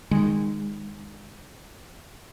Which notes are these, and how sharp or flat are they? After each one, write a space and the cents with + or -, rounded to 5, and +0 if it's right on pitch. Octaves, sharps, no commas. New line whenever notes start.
D#3 -15 G#3 -20